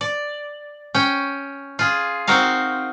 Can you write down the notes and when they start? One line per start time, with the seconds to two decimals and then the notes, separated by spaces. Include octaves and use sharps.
0.01 D5
0.95 C#4 G5
1.79 F4 G#4
2.27 C4 D#4 F#4 A#4 F5